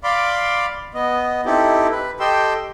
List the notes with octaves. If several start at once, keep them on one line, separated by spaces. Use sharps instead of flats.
D5 F5 B5 C6 D6
B3 D#5
C4 D#4 E4 G4 A4
B4
G4 A4 D#5 G5 C6 E6